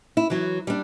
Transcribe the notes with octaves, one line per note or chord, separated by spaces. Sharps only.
E4
E3 F#3
G3 D4